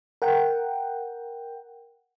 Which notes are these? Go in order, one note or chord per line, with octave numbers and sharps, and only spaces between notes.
A#4 F#5 G5